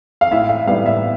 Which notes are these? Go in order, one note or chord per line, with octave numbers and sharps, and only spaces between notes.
F5
A2 E5
F5
G3 B3 F5
E5